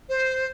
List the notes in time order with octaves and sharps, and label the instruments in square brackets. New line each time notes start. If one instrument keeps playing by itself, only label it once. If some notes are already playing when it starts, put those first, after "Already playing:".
[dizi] C5